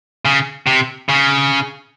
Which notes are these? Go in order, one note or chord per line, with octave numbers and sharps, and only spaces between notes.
C#3
C3
C#3